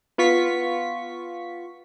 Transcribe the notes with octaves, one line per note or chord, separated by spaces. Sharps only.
B3 F4 C#6 B6